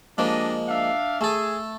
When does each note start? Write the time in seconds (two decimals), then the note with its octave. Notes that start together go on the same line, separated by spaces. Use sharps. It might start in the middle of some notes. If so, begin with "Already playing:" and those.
0.18 F3 G#3 A#3 D4 G4 D#5
0.69 D4 E5 F5
1.21 A3 G#4 A4